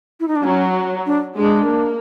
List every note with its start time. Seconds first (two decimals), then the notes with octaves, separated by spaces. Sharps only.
0.20 E4
0.28 D#4
0.36 D4
0.43 F#3 C#4
1.06 D4
1.37 G#3 D4
1.69 A#3